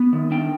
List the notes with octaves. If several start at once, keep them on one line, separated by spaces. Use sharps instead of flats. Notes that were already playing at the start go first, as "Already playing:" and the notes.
Already playing: B3
D#3
D4 G5